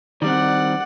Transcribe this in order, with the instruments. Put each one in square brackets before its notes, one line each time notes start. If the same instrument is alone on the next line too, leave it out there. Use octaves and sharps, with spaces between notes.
[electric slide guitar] D#3 G3 C4 [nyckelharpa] D5 F#5